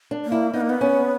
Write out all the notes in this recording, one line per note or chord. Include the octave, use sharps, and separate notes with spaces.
D4
A#3
E4
B3 D#4
A#3
B3
C#4